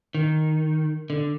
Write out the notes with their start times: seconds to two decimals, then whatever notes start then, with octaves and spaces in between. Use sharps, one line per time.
0.15 D#3
1.10 D3